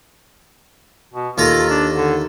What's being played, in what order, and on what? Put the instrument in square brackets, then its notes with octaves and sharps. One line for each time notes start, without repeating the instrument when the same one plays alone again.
[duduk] B2
[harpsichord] D#2 A4 A#5 [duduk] F4
[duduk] D4
D3